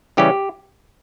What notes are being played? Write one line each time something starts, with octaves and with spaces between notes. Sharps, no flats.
C#3 E3 G3 C#4 G4